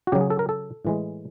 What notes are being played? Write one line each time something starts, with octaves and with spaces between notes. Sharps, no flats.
F#4
C#3 F#3 G4
G#4
A4
A#4
A4
A2 E3 G#3